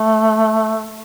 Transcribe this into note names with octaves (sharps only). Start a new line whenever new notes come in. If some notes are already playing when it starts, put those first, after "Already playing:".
Already playing: A3